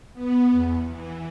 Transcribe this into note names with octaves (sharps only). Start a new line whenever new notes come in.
B3
E2
E3